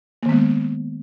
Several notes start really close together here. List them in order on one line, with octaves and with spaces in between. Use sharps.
A#3 D#3 B3 G#3